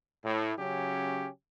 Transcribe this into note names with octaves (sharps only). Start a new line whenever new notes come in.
A2
C#3 F#3 C#4 G4